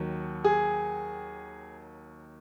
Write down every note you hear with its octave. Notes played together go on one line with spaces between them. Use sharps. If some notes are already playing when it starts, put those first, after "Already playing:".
Already playing: D#2 D#3 F#3
G#4